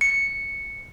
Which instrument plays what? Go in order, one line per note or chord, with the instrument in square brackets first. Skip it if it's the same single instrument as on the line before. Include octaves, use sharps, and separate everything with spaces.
[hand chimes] C#7